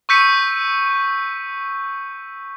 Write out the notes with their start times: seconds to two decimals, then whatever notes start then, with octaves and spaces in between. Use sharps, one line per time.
0.09 C#6 E6 G6 B6 C#7 D#7